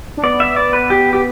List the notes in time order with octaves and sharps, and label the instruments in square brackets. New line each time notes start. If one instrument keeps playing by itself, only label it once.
[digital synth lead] D4
[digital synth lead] B3 [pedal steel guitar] D5
[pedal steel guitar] E5
D5
B4
G4
G4